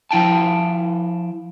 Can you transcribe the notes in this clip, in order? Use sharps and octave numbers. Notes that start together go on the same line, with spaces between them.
F3 E4 G5 A5